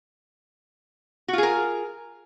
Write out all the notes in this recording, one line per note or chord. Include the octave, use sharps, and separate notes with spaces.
F4 F#4 G#4 A#4